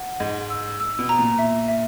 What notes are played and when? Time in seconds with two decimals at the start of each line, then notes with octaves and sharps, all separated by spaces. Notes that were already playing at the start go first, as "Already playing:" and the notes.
Already playing: F#5
0.20 G#2 D#5
0.50 E6
0.80 E6
0.99 B2
1.09 A#5
1.19 A#2
1.39 E5
1.68 E5